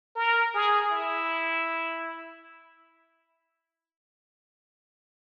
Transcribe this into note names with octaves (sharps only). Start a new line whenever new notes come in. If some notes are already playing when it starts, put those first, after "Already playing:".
A#4
G#4
E4